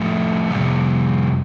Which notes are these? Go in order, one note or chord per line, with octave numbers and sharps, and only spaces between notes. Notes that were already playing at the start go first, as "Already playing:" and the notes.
Already playing: A2 F3 A3
F2 C3 G3